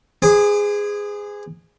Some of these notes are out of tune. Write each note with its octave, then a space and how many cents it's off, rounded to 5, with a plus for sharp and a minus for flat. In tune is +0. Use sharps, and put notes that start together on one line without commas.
G#4 -10 C5 -45 D6 +40